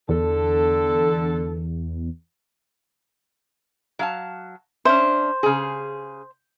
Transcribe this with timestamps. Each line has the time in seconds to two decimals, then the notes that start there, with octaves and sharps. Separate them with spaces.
0.09 E2 D3 A4
3.99 F#3 F5 A5
4.85 C#4 D4 C5 E5
5.43 C#3 G#4